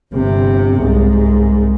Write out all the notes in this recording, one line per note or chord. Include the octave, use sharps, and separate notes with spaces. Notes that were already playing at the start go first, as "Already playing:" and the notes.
G1 C3
C2 G#2